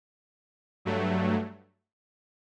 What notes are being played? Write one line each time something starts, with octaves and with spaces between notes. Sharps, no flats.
G2 F#3 A3